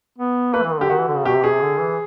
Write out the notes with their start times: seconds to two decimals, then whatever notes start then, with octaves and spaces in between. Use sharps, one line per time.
0.18 B3
0.54 A#3 B4
0.63 E3
0.72 D#3
0.81 D3 G4
0.90 D#3 F#4
0.99 E3
1.07 D3
1.17 C#3
1.25 B2 G4
1.35 C3
1.44 B2 G#4
1.53 C3
1.62 D3
1.80 E3